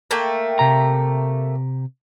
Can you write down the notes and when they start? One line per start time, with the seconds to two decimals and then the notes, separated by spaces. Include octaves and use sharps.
0.11 A3 A#3 G5
0.59 C3 G4 A#5